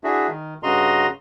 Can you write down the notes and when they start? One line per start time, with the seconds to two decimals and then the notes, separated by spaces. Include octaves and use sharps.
0.04 D4 E4 F#4 G#4 E5
0.28 D#3
0.63 G2 C#3 F#4 D#5 A#5 C6